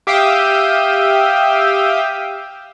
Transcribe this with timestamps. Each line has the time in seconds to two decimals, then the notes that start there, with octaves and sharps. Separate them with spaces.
0.07 G4 E5 F5 G5 D#6